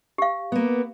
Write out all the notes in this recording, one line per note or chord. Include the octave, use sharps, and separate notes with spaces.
G4 F5
A#3 B3